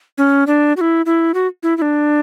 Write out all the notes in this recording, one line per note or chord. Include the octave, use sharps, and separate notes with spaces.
C#4
D4
F#4
E4
E4
F#4
E4
E4
D4